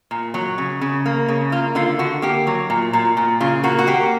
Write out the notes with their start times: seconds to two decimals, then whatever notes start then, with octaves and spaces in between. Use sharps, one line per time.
0.11 A#2
0.34 F#3
0.58 C#3
0.81 C#3
1.06 A#3
1.29 C#3
1.52 A#3 F4
1.75 D3 F4
1.99 D3 F#4
2.22 A#3 G4
2.47 F#3
2.70 A#2
2.93 A#2
3.17 A#2
3.40 C#3 F4
3.64 A#3 F#4
3.79 F#4
3.87 A#3 G4